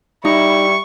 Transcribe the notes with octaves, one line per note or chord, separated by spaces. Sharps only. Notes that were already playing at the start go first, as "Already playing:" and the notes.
G3 D#4 E4 C#6